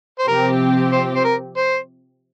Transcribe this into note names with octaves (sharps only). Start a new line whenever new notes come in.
C5
C3 F3 C4 G4 A#4
C5
C5
A#4
C5